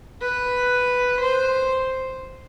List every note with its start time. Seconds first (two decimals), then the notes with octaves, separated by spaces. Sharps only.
0.22 B4
1.21 C5